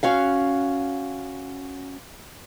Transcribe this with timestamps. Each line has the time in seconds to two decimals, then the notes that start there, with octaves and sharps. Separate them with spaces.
0.03 C#4 F#4 F5